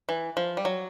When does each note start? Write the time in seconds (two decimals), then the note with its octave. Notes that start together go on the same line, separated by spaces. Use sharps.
0.09 E3
0.37 F3
0.57 G3
0.65 F#3